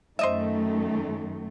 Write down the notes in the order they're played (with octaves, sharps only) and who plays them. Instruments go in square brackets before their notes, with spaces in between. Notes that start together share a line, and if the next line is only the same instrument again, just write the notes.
[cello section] F#2 D#3 A3 [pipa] C5 D#5 E5